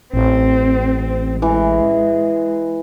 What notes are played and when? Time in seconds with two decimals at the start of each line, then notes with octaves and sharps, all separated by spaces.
0.14 A1 C4
1.01 C4
1.42 E3 G#3